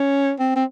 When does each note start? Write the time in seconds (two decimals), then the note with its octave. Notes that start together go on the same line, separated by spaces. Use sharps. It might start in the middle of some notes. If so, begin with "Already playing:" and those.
Already playing: C#4
0.39 C4
0.56 C4